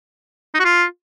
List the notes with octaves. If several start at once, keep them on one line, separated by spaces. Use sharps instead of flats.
D#4
F#4
F4